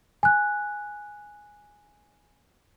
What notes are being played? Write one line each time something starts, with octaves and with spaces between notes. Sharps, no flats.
G#5 F#6